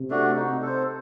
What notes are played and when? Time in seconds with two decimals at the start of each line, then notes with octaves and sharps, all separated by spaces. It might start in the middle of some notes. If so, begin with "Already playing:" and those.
Already playing: C3
0.10 A3 D4 F#4
0.36 D#4
0.62 A4 C5